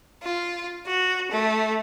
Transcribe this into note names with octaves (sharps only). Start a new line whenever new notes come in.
F4
F#4
A3